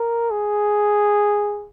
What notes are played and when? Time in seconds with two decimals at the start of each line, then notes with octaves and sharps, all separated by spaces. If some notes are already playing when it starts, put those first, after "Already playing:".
Already playing: A#4
0.31 G#4